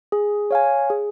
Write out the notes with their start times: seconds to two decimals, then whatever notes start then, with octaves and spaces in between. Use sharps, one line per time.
0.12 G#4
0.51 C#5 F5 G#5
0.90 G#4